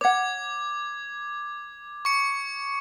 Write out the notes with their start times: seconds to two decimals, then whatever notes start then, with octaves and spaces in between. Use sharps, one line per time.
0.01 C#5 F#5 D6 G#6
2.05 C#6 C#7